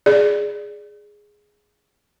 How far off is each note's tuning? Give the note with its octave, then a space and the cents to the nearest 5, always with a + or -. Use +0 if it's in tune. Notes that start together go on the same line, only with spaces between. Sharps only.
G#4 +0 D5 +0